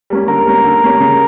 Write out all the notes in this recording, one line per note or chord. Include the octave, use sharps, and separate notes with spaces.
G3 A#3 C#4
D3 A#4
G3 A#3 C#4
D3
G3 A#3 C#4
C#3